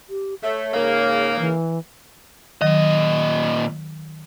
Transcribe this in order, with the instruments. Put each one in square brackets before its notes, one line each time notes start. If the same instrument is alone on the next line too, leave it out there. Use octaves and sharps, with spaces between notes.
[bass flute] G4
[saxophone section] A3 [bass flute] C#5
[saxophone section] G#2 C#3 A#3
[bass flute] E3
[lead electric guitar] A#2 D#5 [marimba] D#3 F#3